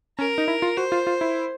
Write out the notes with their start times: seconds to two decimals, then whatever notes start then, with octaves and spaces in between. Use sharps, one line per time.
0.18 C#4 A#4
0.38 D#4
0.48 E4
0.62 F4
0.77 F#4 C5
0.92 F4
1.07 F4
1.21 E4